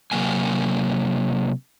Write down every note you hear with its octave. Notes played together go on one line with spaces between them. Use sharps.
C3 F#3 A#3 G#5